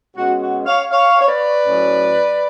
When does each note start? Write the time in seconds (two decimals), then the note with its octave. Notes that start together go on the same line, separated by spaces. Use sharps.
0.16 B2 G#3 C#4 F#4
0.41 F#4
0.66 C#5 F5
0.91 C#5 F5
1.21 C#5
1.28 B4 D5
1.65 A2 F#3 C#4